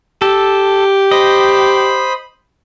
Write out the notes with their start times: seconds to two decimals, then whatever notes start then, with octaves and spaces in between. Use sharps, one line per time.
0.22 G4 A4
1.11 C5 D#5 B5